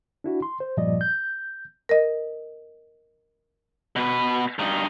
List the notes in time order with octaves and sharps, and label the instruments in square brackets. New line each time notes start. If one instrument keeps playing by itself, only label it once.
[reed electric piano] D4 E4 F#4
C6
C5
G2 A#2 F3 G3 D5 D#5
G6
[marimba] A#4 D#5
[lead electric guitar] B2 B4
G2 D#4